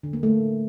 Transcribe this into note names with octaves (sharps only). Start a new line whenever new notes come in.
D3
A#3
A3